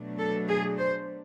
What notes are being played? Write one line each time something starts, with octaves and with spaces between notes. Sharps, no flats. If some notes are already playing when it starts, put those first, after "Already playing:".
Already playing: B2 F#3 A3 D4
A4
G#4
C5